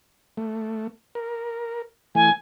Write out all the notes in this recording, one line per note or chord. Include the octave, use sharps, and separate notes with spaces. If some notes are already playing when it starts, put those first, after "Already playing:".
A3
A#4
E3 A3 G#5